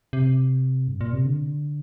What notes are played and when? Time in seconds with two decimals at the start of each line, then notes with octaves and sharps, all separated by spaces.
0.13 C3
0.88 G2
1.01 A#2
1.13 C3
1.26 D3